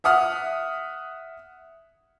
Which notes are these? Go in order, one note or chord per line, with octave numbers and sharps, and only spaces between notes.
E5 F#5 D#6 F6